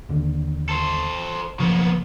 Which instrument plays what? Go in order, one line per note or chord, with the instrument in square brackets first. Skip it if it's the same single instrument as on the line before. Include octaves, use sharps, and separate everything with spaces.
[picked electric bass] D#2 D3
[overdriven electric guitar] A4 C5
[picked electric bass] B1 C#3 F3 [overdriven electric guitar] A#3 B3